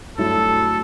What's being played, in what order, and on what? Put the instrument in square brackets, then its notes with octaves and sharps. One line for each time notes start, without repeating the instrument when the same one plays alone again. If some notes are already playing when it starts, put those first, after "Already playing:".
[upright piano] G2 F#3 A3 E4 [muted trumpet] A4